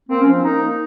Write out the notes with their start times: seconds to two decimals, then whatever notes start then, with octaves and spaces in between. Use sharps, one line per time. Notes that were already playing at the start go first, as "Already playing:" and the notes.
0.09 A#3 C4
0.20 C#4
0.27 F3
0.32 C4
0.44 A#3 D#4
0.62 A#3